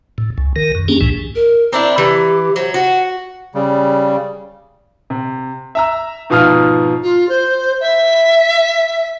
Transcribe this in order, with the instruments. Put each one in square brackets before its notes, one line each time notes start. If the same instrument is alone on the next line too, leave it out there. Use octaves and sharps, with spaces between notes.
[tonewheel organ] A2
C#2
D#3 A#4
F#2
A#3 C#4 D4 G4 G#4
C#2 A2 E3
[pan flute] A#4
[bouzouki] C4 D4 E4 [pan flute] A#5
[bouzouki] E3 [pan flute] G4
[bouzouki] F#3 [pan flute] C5
[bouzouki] F#4 [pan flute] F#5
[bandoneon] C#3 G3
[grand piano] C3
E5 A#5 E6
G#2 B2 F3 F5 D#6 F6
[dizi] F4
C5
E5